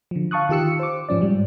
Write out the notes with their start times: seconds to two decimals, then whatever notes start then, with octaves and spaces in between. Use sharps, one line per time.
0.11 D3 F3
0.31 F5 A5 C#6 D#6 F#6
0.49 D#3 F4 G4 E6 C#7
0.79 C5 D6
1.09 G#2 F3 C#4 D5
1.21 G#2 G3